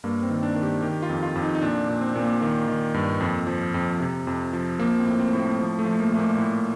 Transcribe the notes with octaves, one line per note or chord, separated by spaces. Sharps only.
G2 A#3
C4
D#3
D4
D#3
G4
D#3 G4
F4
F2
F4
F2
D#4
D#4
A#2 D4
A#2
C4
A#2
A#3
D#3
D#3
G2
F2
F3
F2
C3
F2
F3
F3 A#3
C4
A2
C4
A2
A#3
F3
A3
F3
A#3
A#2 A3
A#3
A2